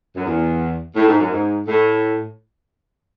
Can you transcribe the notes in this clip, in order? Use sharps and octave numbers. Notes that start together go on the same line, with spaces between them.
F#2
E2
A2
G#2
F#2
G#2
A2